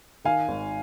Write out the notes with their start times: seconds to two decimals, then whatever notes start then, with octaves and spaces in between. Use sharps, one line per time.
0.25 D#3 F5 G#5
0.48 G#1